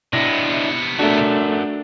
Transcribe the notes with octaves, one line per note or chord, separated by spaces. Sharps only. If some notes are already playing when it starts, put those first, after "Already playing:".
C3 B3 D4 E4 A#6
A3 D4 F#4 A#4